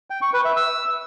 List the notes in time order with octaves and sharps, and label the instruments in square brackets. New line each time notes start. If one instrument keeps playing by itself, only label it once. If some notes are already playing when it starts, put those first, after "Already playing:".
[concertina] G5
C#6
B4
E5
E6